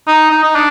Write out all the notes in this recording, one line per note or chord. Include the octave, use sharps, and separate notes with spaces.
D#4
D#4
D#4
D4